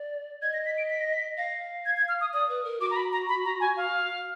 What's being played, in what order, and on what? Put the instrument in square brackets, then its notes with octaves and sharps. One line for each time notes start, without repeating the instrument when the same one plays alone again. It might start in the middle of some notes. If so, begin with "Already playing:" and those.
Already playing: [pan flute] D5
[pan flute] D#5 [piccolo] G#6
[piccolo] A#6
B6
D7
B6
A#6
B6
[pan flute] F5 [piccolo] A#6
[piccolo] G#6
G#6
F6
D#6
[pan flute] D5 [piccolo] D#6
[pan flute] B4
A#4
[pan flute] F#4 [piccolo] D6
[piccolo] A#5
B5
A#5
B5
A#5
G#5
F5